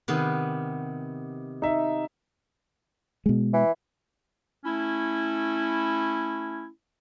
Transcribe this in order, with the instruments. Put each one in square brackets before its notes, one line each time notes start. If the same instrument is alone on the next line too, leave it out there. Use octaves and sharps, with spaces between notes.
[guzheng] C3 D#3 B3
[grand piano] D#4 E5
[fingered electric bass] B2 G#3
[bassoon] E3
[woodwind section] A3 C#4 E4